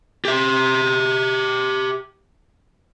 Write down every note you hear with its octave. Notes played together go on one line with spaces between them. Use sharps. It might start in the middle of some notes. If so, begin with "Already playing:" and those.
G4 E5